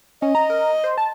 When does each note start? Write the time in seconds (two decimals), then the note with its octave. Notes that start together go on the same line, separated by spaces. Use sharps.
0.22 C#4 D#5
0.35 A#5
0.50 A#4
0.84 C5
0.98 A5